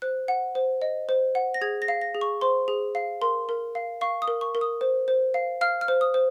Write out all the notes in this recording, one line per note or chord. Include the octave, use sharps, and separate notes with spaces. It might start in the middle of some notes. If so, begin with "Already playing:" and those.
C5 F#6
F#5
C5
D#5
C5
F#5
A#6
G#4 G#6
A#6
F5
A#6
G#4
C#6
C5 C6
G#4
F5
A#4 C6
A#4
F5
F5 C#6
D#6
A#4
C#6
A#4
D#6
C5
C5
F5
F5 F6
F6
C5
D#6
C5